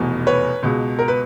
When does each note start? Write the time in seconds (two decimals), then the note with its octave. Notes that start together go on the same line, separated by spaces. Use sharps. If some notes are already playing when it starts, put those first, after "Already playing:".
Already playing: F1 E2 B2
0.27 B4 C#5
0.63 C#2 B2 G#3
0.99 A#4
1.08 B4